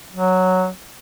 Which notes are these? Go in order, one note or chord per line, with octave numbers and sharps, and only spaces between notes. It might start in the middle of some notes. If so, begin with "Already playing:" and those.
F#3